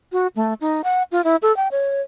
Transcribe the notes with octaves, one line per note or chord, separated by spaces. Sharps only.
F#4
A3
D#4
F#5
F4
E4
A4
G5
C#5